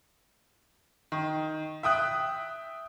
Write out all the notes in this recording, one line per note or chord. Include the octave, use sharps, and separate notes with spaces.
D#3
E5 G5 D#6 F#6